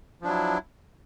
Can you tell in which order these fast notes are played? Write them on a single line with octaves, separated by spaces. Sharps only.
F3 D4 F#3 E4